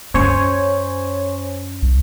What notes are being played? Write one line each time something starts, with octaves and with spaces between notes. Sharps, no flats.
F#2 C#4 C5 C#5 G#5
C2